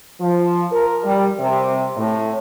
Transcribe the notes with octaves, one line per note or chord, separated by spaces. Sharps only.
F3
A#4
G3
C3
A2